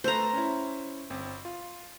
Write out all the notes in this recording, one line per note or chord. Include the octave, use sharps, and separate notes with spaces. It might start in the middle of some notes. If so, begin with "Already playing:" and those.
A3 A4 B4 C5 A#5
C#4 E4
G1 C4
F4